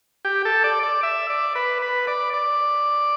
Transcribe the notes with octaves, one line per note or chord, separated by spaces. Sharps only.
G4
A4
D5
D5
E5
D5
B4
B4
D5
D5